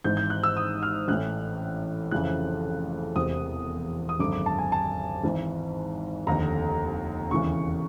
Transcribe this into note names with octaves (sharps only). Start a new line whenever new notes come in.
G#1 G#2 E3 G6
G6
F#6
E6
D#6
F6
A1 A2 E3 F#6
F1 F2 C#3 E3 F#6
E1 E2 C3 D#6
D#6
G#1 F#2 D3 D6
D6
A5
G#5
A5
G#1 G#2 E3
F1 D#2 D3 A#5
E1 D#2 C#3 E3 C#6